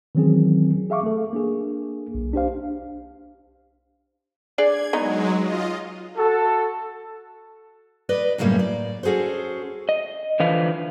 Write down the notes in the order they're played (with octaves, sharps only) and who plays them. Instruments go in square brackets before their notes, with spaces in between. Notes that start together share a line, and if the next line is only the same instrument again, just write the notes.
[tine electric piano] D#3 E3 F#3 C4 C#4 G#4
G#4 E5 F5 C#6 D6
A3 A4
A#3 D4 G#4
B1
D4 G4 C5 F5
[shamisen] D4 G#4 D5 [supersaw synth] G#6
[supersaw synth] F#3 G#3 [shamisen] B3 D#4
[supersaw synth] F4 D#5
[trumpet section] F#4 A4
[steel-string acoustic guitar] B4 D5 D#5
F#2 A2 C#3 G3 A#3 C#4
D5
C#4 F#4 G#4 A4 C5
[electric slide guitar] D#5
D3 E3 F3 B4 F5